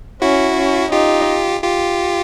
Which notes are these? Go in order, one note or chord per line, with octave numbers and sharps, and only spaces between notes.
C#4 E4 F#4
C#4
D#4 F4 G4
F4 G4